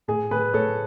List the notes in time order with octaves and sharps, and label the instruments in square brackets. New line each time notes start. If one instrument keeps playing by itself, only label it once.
[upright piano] A2 G#4
A2 G#4 B4
A2 A4 C#5